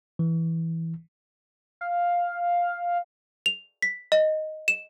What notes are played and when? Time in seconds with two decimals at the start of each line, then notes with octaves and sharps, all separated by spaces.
0.19 E3
1.81 F5
3.46 F7
3.82 B6
4.12 D#5
4.68 E7